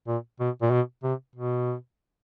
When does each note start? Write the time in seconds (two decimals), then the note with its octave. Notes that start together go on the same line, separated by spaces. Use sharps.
0.07 A#2
0.40 B2
0.62 A#2
0.71 B2
1.04 C3
1.36 B2